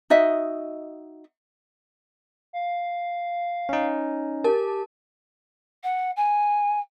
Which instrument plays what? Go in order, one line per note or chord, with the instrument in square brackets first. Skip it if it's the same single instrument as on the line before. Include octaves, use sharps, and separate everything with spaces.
[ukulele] D#4 F#4 D#5 E5
[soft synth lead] F5
[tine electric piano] C#4 D#4
[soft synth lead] G4 [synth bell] A#4 A5
[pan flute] F#5
G#5